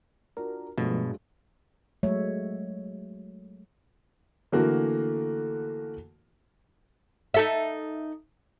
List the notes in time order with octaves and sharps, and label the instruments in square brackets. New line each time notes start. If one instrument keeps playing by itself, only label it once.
[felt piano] D4 F4 F#4 [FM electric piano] A#4
[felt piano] G2 F#3 G#3 [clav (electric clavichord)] B2 [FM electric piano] F3 A3
[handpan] F#3 G#3 A3 C#5 E5
[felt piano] D3 E3 A3 A#3 F#4 A#4
[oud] D#4 A4 E5